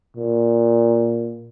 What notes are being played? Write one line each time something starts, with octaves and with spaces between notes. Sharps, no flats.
A#2